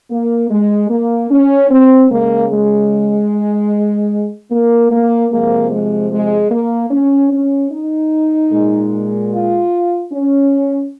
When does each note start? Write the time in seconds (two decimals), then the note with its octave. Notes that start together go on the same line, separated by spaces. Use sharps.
0.10 A#3
0.50 G#3
0.90 A#3
1.31 C#4
1.70 C4
2.10 C#3 G#3 A#3
2.51 G#3
4.51 A#3
4.91 A#3
5.31 C3 F3 G#3 A#3
5.72 G#3
6.11 G#3
6.51 A#3
6.91 C#4
7.31 C#4
7.72 D#4
8.51 A#2 G#3
9.32 F4
10.12 C#4